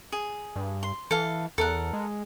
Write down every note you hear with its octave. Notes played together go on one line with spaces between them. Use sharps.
G#4
G2
C6
E3 A4 F5
E2 A4 A#4 F#5
G#3